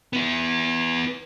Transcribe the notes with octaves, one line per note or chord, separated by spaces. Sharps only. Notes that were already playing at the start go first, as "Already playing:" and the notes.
B3 E4